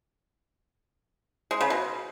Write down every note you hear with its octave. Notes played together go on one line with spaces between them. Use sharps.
G#3
C#3
B2